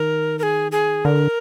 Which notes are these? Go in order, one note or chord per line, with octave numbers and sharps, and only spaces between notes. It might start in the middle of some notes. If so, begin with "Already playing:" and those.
Already playing: D#3 A#4
A#4
G#4
G#4
D3 A#4